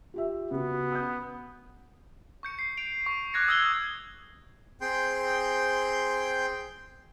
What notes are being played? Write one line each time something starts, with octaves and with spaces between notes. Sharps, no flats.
F4 G4 E5
C#3 B3 F#4
D#6 G6
C#6 G6 C#7
C7
D7 F7
C#6
D6 F6 F#6 G#6 A#6 C#7
D#6 E6 G6 G#6 C7 G7
C4 G#4 G5 C6 G6